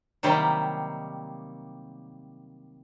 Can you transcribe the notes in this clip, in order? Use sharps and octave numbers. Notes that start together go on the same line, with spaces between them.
C3 D#3 F#3 G3 A#3